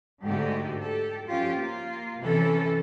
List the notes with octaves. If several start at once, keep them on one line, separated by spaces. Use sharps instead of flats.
G#2 D3 A3 F#4 G4
G4 A4
F3 C#4 F4 G4
A#3 F4
C3 E3 C#4 A4